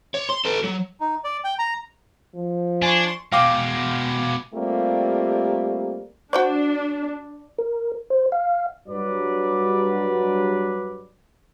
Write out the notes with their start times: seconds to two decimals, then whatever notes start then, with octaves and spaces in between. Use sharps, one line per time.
0.14 C#5
0.29 C6
0.45 A4 B4
0.64 F#3
1.00 D#4
1.24 D5
1.44 G5
1.59 A#5
2.35 F3
2.82 D4 G#5 C6 C#6
3.32 B2 G#3 F5 G5 D6
4.54 G3 A3 A#3 C4 F4 G4
6.33 D4 F#4 C5 D5
7.58 A#4
8.10 C5
8.32 F5
8.89 G2 F#3 B4 D5